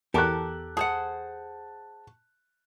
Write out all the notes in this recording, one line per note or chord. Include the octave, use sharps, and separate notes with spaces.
E2 G4 A4 A#4 A5 D6 F#6
G#4 C5 F#5 A5